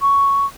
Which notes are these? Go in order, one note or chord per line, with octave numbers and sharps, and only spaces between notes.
C#6